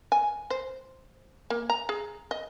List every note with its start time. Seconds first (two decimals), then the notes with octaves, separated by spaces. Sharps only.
0.12 G#5
0.50 C5
1.50 A#3
1.70 A#5
1.89 G#4
2.31 D#5